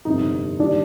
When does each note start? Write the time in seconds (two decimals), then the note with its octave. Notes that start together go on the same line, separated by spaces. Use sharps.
0.05 G1 F2 C3 D#4
0.59 D#2 D#3 G3 D4